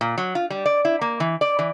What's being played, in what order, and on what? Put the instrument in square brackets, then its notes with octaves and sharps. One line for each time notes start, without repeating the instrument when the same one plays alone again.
[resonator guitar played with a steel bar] A#2
F#3
F4
G3
D5
E4
A#3
E3
D5
E3